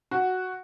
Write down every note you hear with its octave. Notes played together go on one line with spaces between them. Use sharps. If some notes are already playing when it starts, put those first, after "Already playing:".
F#4